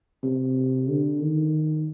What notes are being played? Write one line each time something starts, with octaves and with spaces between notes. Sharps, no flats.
C3
D3
D#3